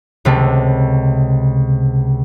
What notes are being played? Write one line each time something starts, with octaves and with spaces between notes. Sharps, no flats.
C#2 C3 A3